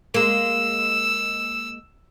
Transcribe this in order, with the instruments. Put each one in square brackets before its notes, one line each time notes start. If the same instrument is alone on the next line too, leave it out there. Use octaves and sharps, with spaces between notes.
[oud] G#3 A#3 [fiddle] E6